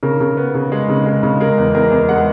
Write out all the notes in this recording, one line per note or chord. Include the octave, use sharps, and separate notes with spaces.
C#3 A#4
C#3
B3
C#3
G#3
C#3
G#3
C#3
G#3 A#4
E2
E2 A#4
E2
G#3 F#5